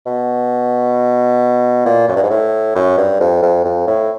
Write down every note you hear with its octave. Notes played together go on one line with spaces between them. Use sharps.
B2
A#2
F#2
G2
G#2
A2
F#2
G2
F2
F2
F2
A2